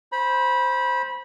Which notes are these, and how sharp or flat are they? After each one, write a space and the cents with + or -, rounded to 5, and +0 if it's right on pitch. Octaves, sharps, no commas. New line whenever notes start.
C5 +0 B5 -25